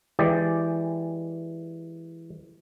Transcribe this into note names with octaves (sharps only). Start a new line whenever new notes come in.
E3 G#3 G4 D5